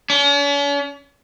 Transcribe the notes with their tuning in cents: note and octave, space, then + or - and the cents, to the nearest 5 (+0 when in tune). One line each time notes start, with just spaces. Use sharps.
C#4 +45